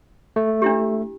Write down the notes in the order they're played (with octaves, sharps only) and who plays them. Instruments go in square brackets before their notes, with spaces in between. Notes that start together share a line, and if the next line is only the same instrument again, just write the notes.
[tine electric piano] A3
[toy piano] D4 E4 G4